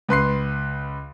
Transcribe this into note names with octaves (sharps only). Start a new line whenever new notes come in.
C#2 B4 C6 C7